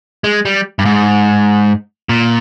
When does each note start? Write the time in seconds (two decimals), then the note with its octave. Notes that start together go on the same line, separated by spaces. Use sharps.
0.24 G#3
0.45 G3
0.79 G2
0.85 G#2
2.09 A#2